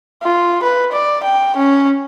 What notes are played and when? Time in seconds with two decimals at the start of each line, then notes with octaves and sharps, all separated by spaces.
0.23 F4
0.63 B4
0.92 D5
1.24 G5
1.56 C#4